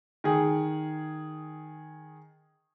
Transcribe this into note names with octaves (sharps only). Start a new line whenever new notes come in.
D#3 G#4